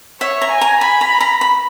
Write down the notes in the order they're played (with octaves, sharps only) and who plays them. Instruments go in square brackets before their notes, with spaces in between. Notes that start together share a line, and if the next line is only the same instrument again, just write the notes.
[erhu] C#5 [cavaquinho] E5
[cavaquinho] A#5
[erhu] G#5
[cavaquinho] A#5
[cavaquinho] G#5 [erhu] B5
[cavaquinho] A#5
A#5
B5